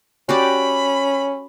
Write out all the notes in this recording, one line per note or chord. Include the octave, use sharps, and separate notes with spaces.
C#4 F#4 G4 D5 B5